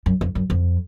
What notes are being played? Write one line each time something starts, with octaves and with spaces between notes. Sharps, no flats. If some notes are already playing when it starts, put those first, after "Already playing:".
F#2
F2
F#2
F2